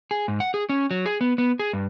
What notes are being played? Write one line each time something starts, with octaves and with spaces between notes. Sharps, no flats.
G#4
G#2
F#5
G#4
C#4
F#3
G#4
B3
B3
G#4
G2